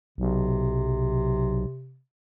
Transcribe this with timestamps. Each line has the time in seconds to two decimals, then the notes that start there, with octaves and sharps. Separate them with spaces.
0.18 B1 C3